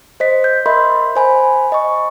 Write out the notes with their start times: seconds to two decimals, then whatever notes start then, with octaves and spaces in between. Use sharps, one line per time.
0.20 C5 D#5 B6
0.44 G6
0.66 A#4 D#5 E5 B5 C6
1.16 C5 G#5 B5
1.72 D#5 C#6